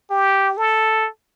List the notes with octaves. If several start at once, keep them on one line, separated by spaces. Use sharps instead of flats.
G4
A4